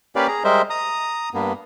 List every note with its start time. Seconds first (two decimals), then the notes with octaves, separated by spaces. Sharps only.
0.16 A#3 C#4 G4 B4 D5 F5
0.28 G#4 A#5
0.44 G3 G#3 A#4 C5 D#5 E5
0.70 A#5 D#6
1.34 G2 A#3 B3